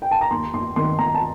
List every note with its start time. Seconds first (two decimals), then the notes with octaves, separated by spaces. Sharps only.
0.02 G5
0.11 A5
0.21 A#5
0.31 D#2 C6
0.53 D#2 C6
0.76 D#3 C6
0.99 D#3 A#5
1.15 A5